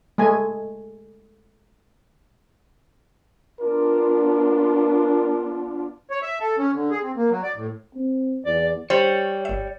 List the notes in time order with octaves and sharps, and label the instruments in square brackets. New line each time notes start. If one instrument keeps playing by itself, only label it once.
[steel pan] G#3 A3 G#5
[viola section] B3 D4 F4 [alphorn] A#4
[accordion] C#5
E5
A4
C#4
D3
G#4
C4
A#3
F#3
D5
A2
[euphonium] C4
[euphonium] E2 [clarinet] D5
[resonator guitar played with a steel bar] G3 [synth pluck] C5 [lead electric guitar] C#5
[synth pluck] G1 E5